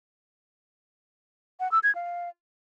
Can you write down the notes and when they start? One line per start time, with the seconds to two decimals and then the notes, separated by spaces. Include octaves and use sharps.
1.60 F#5
1.72 E6
1.83 G#6
1.95 F5